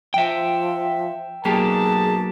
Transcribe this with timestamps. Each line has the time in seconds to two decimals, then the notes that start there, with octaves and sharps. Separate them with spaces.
0.14 F3 E5 G5
1.45 B1 F#3 A#3 G4 G#4 A#4 A5